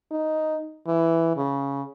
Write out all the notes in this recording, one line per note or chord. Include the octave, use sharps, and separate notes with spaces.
D#4
E3
C#3